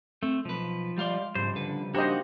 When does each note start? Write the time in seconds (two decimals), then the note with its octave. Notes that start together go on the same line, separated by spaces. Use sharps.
0.23 A3 C4
0.45 B1 F3 B4
0.98 G3 G#3 D5 F5 C6
1.35 G#2 C#3 F3 G3 C5
1.56 D3 B4
1.94 A#3 D4 D#4 F#4 G4 C5 D#5